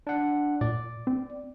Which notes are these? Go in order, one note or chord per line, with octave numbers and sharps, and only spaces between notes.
D4 F#5
A#2 D5
C4